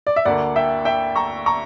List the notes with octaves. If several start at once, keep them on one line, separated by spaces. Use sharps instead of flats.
D5
E5
D2 D3 A#3 D5 F#5
E5 G5
E5 G5
A#5 C#6
A#5 C#6